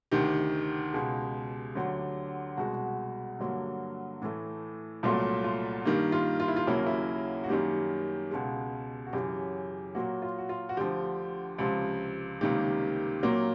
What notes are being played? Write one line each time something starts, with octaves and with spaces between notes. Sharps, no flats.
D2 C3 D#3 G4
C#2 B2 G#3
D2 D3 F#3
C2 B2 G#3 F#4
G2 D3 F#3 A#3
A2 E3 A3
C2 A#2 F#3 A3 F4
F4
G2 D#3 G3 A#3
F4
F4
E4
F4
D#2 C#3 F#3 A#3 E4
E4
F#4
F#2 D#3 G3 A#3 G4
C#2 B2 G#3
F#4
F#2 C#3 E3 G4
A#2 F#3 A#3 F#4
F4
F#4
F4
F#4
D2 D3 F3 G4
C#2 C3 F3
C#2 C3 D#3 G3 A#3 G4
A#2 F#3 A#3